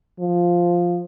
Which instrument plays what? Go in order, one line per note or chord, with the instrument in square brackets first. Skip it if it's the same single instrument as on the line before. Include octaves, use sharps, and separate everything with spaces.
[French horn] F3